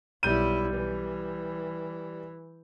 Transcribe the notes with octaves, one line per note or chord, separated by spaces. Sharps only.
B1 G3 E4 G6 D#7
E3